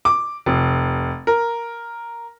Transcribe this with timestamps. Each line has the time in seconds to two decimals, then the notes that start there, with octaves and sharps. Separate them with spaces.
0.05 D6
0.46 F1
1.27 A#4